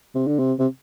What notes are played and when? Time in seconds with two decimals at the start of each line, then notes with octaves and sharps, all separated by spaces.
0.15 C3
0.27 D3
0.39 C3
0.59 C3